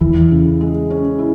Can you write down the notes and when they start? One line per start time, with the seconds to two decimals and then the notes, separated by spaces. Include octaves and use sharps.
0.01 E2 E3 E4
0.31 C#3
0.61 G#3
0.90 C#4
1.19 E4